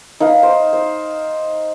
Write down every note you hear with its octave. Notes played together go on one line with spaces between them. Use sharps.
D#4 B4 F5
C5
C5